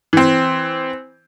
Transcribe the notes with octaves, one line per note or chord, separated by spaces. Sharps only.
E3 C4